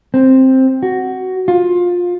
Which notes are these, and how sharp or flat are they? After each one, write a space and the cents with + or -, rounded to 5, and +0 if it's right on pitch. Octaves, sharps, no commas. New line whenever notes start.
C4 +5
F#4 +10
F4 +20